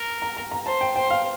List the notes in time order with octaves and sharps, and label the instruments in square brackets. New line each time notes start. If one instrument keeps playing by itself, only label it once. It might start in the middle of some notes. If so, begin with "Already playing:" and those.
Already playing: [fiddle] A#4
[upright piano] A#5
A#5
A#5
[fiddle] C5 [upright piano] A5
[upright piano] G5
[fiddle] C5 [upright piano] G5
[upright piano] F5